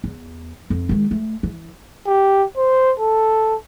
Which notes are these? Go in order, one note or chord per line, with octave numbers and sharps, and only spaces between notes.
E2
F2
D#3 G#3
A3
E3
G4
C5
A4